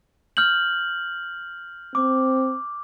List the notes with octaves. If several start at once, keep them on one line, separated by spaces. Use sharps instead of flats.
F6 G6 F#7
C4 D6